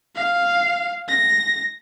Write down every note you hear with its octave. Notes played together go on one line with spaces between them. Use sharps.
F5
A#6